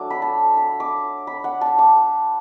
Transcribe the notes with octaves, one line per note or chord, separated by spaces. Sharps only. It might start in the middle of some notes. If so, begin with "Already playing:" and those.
Already playing: F#3 A3 D4 D6
B5
A5
B5
D6
B5
F#5
A5
D6